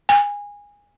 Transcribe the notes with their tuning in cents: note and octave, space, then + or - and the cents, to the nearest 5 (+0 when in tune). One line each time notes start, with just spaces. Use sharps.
G#5 -20